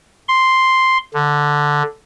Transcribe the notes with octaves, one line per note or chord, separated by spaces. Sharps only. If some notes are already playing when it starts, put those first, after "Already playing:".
C6
D3